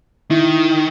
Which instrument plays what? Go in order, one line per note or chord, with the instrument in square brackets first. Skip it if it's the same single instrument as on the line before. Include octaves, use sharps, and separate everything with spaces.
[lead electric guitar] D#3 [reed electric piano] E4